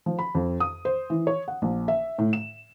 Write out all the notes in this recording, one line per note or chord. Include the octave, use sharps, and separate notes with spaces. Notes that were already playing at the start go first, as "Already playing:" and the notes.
F3
B5
F2
D#6
C5
E3
C#5
F#5
A#1
E5
A2
E7